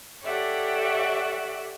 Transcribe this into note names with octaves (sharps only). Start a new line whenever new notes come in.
G4 A4 C#5 D5 E5 F#5